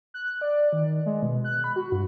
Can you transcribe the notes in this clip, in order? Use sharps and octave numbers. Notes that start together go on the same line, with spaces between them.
F#6
D5
D#3
G#3
B2
F#6
B5
F#4
G2